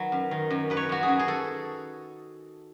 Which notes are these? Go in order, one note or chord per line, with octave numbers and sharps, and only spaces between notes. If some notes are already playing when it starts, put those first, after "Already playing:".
Already playing: D#3 F#3 B4
F#2
D#3
F#2
F#2 B4
C#5
F#2 F#4
G#4
F#2
G#4
A4